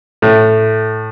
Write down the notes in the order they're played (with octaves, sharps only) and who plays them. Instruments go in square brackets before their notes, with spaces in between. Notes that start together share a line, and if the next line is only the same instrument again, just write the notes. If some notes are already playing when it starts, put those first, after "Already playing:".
[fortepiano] A2